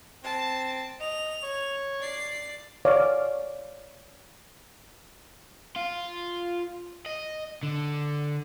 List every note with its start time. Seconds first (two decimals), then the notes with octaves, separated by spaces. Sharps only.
0.24 C4 A5
1.00 D#5 F7
1.43 C#5
2.00 D5 C7
2.85 C#5 D5 F5
5.76 F4
7.06 D#5
7.63 D3